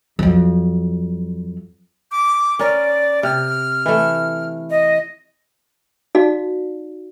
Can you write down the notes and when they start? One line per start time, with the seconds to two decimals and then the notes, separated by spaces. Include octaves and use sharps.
0.19 F2 F#3
2.11 D6
2.59 C#4 A#4 D5
3.23 C3 F6
3.86 E3 A3
4.70 D#5
6.15 D#4 F#4 D5 F5